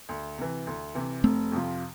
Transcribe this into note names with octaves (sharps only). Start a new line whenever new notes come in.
D2
C3 E3
D2
C3 E3
F1 A3 C4
F2 C3 F3